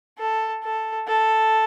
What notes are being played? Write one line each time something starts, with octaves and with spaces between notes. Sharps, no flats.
A4
A4
A4